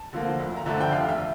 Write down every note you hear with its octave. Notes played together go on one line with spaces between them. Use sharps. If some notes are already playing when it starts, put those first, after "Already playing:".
Already playing: A5
D3 F3 A#3
D2
A#5
D3 F3 A3 D4 A5
G5
F1 F5
E5